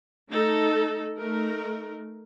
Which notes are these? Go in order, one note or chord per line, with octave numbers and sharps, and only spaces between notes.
A3 D#4 A4
A3 D#4 A#4